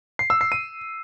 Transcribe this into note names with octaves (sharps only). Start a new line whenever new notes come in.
C7
E6
C7
D#7